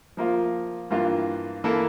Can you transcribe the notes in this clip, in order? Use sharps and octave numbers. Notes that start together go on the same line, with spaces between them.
F3 A#3 F4
G2 E3 A#3 F4
E3 A#3 E4 A4